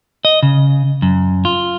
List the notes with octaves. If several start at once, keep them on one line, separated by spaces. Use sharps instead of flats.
D#5
C#3
F#2
F4